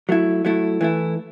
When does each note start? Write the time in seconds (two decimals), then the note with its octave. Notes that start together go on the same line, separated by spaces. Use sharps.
0.09 F#3 A3 E4
0.45 F#3 A3 E4
0.81 E3 A3 E4